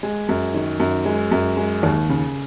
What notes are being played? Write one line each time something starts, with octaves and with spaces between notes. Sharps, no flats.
G#3
F#2
D#3
F#2
G#3
F#2
G#3
D#2
C#3